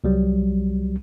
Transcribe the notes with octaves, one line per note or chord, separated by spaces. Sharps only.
C2 F#3 G3